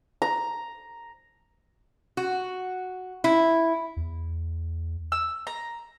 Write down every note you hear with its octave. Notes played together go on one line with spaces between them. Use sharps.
A#5
F#4
E4
E2
E6
A#5